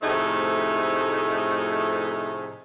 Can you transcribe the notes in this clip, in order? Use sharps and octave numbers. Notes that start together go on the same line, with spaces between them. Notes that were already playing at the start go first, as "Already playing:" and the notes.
A2 C3 F3 A3 D#4 G#4